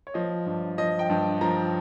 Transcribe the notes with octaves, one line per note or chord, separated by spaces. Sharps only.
C#5
F3 D#5
G2
F3 D#5
G5
G2
F3 A#5